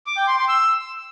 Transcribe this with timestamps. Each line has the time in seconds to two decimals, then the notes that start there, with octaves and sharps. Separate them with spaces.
0.07 D6
0.17 G5
0.28 C6
0.38 C6
0.49 E6